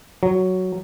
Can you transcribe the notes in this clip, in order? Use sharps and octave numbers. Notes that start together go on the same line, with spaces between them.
F#3